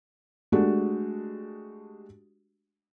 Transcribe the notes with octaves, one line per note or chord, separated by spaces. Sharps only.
G#3 A3 D4 F#4 G4